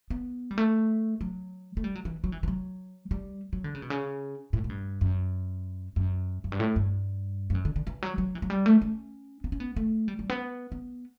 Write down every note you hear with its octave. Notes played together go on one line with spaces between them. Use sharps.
B3
G3
A3
F#3
A3
G3
F#3
E3
F#3
E3
E3
F#3
G3
F#3
D3
C#3
B2
C#3
A2
A2
G2
F#2
F#2
F#2
G2
A2
G2
G2
F#2
D3
D3
E3
F#3
F#3
E3
F#3
G3
A3
C#4
B3
C#4
B3
A3
G3
G3
B3
B3